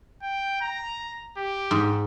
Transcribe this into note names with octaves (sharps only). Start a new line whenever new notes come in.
G5
A#5
G4
G#2